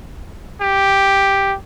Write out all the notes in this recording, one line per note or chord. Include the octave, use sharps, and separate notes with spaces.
G4